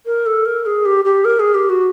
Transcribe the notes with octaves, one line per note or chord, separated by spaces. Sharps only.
A#4
A4
A#4
G#4
G4
G4
A#4
G#4
G4
F#4